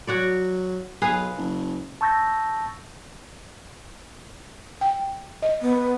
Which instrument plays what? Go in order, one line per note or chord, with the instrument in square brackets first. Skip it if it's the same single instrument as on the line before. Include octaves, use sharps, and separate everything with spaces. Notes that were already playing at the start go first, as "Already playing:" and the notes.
[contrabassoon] F#3 [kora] F#4 C#5 D5
[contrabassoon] B1 [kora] G#4 B4 F5
[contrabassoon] F#1
[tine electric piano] A5 C#6 E6 G6 A6 A#6
[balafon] G5
D#5
[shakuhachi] B3